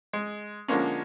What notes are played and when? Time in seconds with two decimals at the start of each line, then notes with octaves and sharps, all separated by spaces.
0.13 G#3
0.68 D3 F3 G#3 A#3 C#4